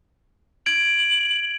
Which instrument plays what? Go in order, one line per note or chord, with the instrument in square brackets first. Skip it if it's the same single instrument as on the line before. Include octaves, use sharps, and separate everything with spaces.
[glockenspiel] G#6 D7 [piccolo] F#7